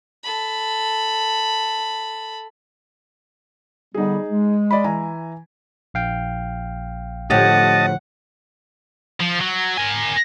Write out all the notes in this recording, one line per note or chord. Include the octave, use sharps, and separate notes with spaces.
A4 B5
D3 G3 B3 D#4 G#4
G#3
D5 D#5 B5
E3 G#5 A#5
A#1 F5 G5
A2 D3 F3 G4 D#5 F#5 A5
F3
F#3
A#4 G#5